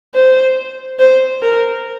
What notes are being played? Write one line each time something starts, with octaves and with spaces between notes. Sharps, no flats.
C5
C5
A#4